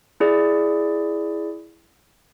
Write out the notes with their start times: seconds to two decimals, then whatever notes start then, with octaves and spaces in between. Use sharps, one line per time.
0.20 E4 G#4 D5